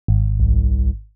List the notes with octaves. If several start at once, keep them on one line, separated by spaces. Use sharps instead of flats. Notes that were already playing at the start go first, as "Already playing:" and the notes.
G#1
C2